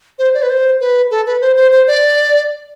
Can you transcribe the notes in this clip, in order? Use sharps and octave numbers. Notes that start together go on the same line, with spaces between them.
C5
D5
B4
C5
B4
A4
B4
C5
C5
C5
D5